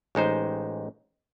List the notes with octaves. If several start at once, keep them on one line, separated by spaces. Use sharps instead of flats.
A1 G#3 D#4 C5